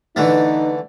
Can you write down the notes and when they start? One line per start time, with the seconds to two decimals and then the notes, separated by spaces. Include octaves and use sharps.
0.16 D3 E3 A3 D#4